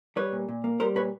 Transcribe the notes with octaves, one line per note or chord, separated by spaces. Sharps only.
G3 B4 C#5
A#2
A#2
A#3
G3 A#4 C5
A#2 B4 C#5